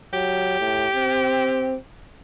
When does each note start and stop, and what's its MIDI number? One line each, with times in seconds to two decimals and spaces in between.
0.13 0.57 54
0.13 1.77 67
0.60 0.86 45
0.96 1.76 60